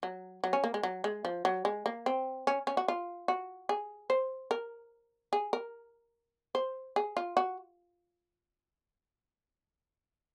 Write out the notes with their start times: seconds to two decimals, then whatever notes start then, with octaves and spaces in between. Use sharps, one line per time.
0.03 F#3
0.44 F#3
0.53 C#4
0.64 A#3
0.74 G#3
0.83 F#3
1.04 G#3
1.25 F3
1.45 F#3
1.65 G#3
1.86 A#3
2.06 C4
2.47 C#4
2.67 C#4
2.77 F#4
2.88 F4
3.28 F#4
3.69 G#4
4.10 C5
4.51 A#4
5.33 G#4
5.53 A#4
6.55 C5
6.96 G#4
7.17 F4
7.37 F#4